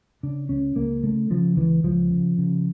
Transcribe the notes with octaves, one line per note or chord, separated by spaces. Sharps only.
C#3 D4
C#2 C#4
C#2 A#3
C#3 A3
C#3 F3
C#2 E3
C#2 F3
C#3
C#3